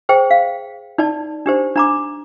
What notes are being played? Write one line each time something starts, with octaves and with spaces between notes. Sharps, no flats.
G#4 C5 G5
F5
D#4 D5 A5
D4 G4 C5
D4 A#5 D6